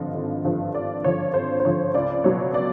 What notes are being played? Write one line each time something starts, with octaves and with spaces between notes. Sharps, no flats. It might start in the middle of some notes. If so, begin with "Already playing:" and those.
Already playing: G#1 G2 D3 F3 D#5
G#1
G2 D3 F3
G#1 D5
G2 D3 F3 C#5
G#1 C5
C5
G2 D3 F3 C#5
C#2 D5
B2 F#3 B3 C#5
D5